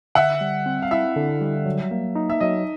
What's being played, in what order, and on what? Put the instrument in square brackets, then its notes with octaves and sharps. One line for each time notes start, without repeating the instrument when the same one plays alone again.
[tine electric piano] D3 [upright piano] E5 F#5
[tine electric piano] G3
C4
[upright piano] F5
[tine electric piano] E4 [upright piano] E5
[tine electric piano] D3
G3
F#3
A#3
D#4
[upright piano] E5
[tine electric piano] F#3 [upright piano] D#5